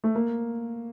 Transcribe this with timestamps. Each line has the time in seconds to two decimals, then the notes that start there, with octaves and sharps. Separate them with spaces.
0.04 A3
0.15 A#3